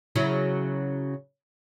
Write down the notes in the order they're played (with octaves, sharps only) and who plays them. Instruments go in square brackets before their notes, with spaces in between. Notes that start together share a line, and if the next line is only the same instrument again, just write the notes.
[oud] C#3 F#3 E4